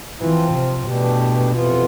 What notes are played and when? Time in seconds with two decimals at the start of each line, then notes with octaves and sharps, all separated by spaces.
0.19 E3 F3 C4 F4
0.53 C3
0.85 G2 B2 E3 A3 D4 G4
1.51 F2 C3 E3 B3 F4